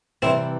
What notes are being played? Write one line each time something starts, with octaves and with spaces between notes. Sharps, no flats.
C3 E3 G3 C4 E4